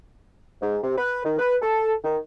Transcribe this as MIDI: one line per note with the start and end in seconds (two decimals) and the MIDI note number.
0.62 0.77 44
0.83 0.96 48
0.98 1.23 71
1.25 1.35 51
1.39 1.57 71
1.62 1.93 69
2.04 2.18 51